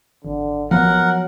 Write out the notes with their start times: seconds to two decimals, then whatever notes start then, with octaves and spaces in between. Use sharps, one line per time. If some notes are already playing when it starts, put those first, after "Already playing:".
0.25 G#1 D3
0.71 F3 F#3 B3 A#4 F#5